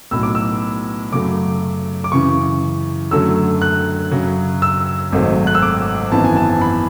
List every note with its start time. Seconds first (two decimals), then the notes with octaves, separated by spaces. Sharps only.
0.11 B1 A2 F#3 B3 E6
0.23 D6
0.35 E6
1.12 F#2 C#3 F#3 A3 D6
2.04 D6
2.11 F#2 C#3 E3 C#6
3.11 F#2 D3 F#3 A3 E6
3.62 F#6
4.11 F#2 C#3 F#3
4.62 E6
5.12 G#1 G#2 F#3 A3
5.47 F#6
5.55 E6
5.63 D6
6.12 G#1 F#2 E3 B3 A5
6.25 G#5
6.36 A5
6.50 A5
6.61 B5